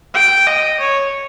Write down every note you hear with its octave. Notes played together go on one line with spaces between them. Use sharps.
G5
D#5
C#5